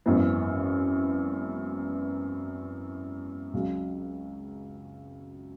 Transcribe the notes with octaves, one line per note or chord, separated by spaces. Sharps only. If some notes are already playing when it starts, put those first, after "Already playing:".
G#1 F#2 E3 B3
C#2 C#3 F#3